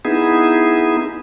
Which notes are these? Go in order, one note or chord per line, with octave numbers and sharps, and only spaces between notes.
B3 D#4 E4 G#4